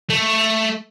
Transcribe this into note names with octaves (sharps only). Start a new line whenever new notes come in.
A3